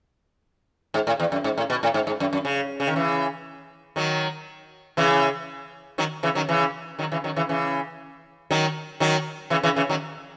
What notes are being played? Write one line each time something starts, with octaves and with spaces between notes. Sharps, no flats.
G#2
A2
E2
F#2
G#2
A2
B2
A2
G#2
G#2
F#2
F#2
C#3
C#3
D#3
C#3 E3
D#3 F#3
C#3 E3
D#3 F#3
C#3 E3
D#3 F#3
C#3 E3
D#3 F#3
C#3 E3
D#3 F#3
C#3 E3
C#3 E3
D#3 F#3
D#3 F#3
C#3 E3
C#3 E3
C#3 E3
D#3 F#3